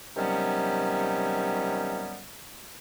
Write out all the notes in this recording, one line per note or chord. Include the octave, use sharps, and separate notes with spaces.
C3 D#3 F#3 G3 B3 C#4